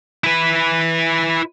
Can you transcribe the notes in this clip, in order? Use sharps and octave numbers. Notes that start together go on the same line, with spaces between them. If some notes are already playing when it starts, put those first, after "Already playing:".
E4 B4